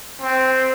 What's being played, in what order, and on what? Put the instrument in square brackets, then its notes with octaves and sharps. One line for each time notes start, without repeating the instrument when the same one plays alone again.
[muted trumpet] C4